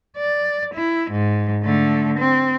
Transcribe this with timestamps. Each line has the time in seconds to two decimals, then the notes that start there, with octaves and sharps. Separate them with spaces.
0.17 D5
0.74 E4
1.11 G#2
1.63 D3 A3
2.19 C4